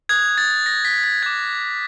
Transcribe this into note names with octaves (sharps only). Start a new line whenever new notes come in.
D#6 F#6 G#6
A6
A#6
B6
A6
D6 F#6 G#6